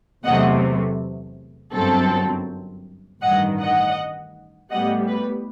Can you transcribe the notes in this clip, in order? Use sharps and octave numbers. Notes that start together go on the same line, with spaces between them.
E2 C3 F#3 A3 D#5 F#5
G1 F#2 F#3 C4 A4
A1 G2 D#3 D#5 F#5
D#5 F#5
A2 G3 B3 D#5 F#5
B4